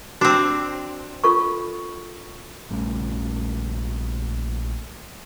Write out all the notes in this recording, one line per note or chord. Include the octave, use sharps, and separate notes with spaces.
C4 D4 F#4
F4 A4 C#6
A#1 G3 A3 C#4